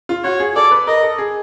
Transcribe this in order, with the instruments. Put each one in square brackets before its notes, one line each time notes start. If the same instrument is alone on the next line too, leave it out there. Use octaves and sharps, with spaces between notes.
[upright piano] F4
[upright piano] F#4 [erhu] C#5
[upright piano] G#4
[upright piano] A4 [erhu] D5
[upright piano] B4
[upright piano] A#4 [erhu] D#5
[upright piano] A4
G#4